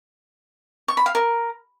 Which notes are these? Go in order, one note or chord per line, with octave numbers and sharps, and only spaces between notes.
C#6
B5
F5
A#4